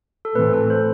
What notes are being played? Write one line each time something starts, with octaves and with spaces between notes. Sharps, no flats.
A4
A2 E3 A3 C4 B4
A4
C5